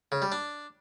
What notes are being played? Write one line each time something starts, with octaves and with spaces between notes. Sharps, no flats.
C#3
G3
D4